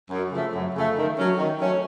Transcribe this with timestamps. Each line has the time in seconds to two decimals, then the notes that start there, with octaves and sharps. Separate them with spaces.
0.10 F#2
0.31 C#3 F3 A3
0.53 F#2
0.74 C#3 F3 A3
0.96 D#3
1.17 F#3 A3 C#4
1.38 D#3
1.60 F#3 A3 C#4